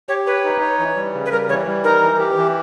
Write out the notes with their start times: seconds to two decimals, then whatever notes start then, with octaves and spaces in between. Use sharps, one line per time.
0.08 G4 C#5
0.26 B4 C#5
0.44 D#4
0.61 C#5
0.79 E3
0.96 G3
1.14 C#3
1.26 B4
1.31 G3 A#4
1.49 E3 C#5
1.67 G3
1.84 D#4 A#4
2.02 E3
2.19 G4
2.37 E3